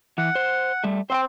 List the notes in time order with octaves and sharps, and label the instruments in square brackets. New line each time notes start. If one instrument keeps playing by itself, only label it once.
[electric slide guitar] E3 [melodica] F#5
[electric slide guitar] C5
G3 A3
[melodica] C4 [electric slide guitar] C5 F#5 G5